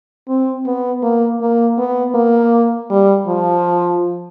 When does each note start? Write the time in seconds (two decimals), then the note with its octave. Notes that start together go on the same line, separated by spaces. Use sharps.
0.28 C4
0.66 B3
1.03 A#3
1.41 A#3
1.78 B3
2.15 A#3
2.90 G3
3.27 F3